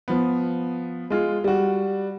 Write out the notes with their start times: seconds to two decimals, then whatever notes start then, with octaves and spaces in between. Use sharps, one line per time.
0.08 F3 B3
1.10 G#3 F4
1.44 G3 F#4